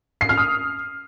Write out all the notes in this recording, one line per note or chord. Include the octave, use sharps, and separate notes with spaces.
C7
F6
D#6